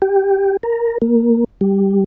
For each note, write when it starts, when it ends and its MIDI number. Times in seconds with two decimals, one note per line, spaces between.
0.02 0.57 67
0.63 0.98 70
1.02 1.44 58
1.61 2.04 55